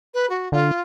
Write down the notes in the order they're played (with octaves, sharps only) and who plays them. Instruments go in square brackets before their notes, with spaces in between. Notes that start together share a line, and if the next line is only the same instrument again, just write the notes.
[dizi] B4
F#4
[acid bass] D3 [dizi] F4